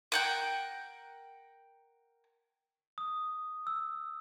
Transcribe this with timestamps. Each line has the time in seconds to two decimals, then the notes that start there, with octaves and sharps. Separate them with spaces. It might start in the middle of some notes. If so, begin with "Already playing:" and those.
0.12 A#4 F#5 G5
2.98 D#6
3.67 E6